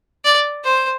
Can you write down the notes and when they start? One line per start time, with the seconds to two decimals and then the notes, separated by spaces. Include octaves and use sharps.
0.25 D5
0.64 C5